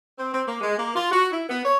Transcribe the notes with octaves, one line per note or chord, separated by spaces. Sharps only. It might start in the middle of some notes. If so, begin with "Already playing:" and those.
C4
C4
A#3
G#3
A#3
F4
F#4
E4
B3
C#5